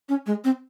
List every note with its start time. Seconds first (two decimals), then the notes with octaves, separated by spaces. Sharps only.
0.09 C#4
0.26 G#3
0.44 C4